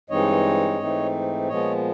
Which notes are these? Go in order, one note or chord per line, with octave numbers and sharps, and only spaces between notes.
G2 E3 G#3 C4 D#4 C#5 D#5
G#2 E3 A3 C4 D#4
A#2 F3 G#3 B3 C#5 D#5